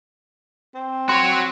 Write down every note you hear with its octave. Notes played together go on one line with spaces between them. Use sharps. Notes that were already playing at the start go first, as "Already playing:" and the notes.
C4
F#4 C#5 C6